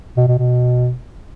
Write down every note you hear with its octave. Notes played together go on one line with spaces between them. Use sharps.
B2
B2
B2